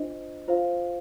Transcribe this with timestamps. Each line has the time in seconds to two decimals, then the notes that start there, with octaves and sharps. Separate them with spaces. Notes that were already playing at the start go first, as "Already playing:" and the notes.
Already playing: D4 F4 C5 D#5
0.48 F4 C5 F5